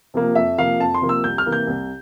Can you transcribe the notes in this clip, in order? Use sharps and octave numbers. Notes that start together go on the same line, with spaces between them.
C3 F3 A#3
F2 E5
C3 F3 A#3 F5
F2 A5
C6
C3 F3 A#3
E6
C2 G6
F6
C3 E3 A#3
G6
C2